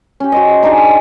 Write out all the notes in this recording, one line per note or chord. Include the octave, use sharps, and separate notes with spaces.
C#4 G4
F#4 C5 D#5
D4 D#4 G4 G#4